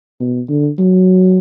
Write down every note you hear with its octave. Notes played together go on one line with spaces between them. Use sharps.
B2
D3
F#3